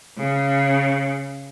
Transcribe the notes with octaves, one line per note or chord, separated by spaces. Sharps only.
C#3